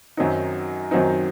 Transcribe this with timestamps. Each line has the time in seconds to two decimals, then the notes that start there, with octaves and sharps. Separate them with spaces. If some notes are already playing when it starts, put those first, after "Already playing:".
0.17 F#2 D#3 F#3 C4 D#4
0.91 F#2 D#3 F#3 C4 D#4